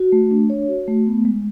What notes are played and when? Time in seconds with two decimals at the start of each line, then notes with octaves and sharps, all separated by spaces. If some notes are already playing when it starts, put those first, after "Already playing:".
Already playing: F#4
0.12 A3
0.31 D4
0.50 C#5
0.68 F#4
0.88 A3
1.06 B3
1.25 G#3